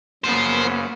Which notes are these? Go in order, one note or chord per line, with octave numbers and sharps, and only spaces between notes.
F#2 C#3 A#3 B3 F4 C5